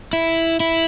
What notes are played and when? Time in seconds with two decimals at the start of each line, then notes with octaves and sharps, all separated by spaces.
0.13 E4
0.60 E4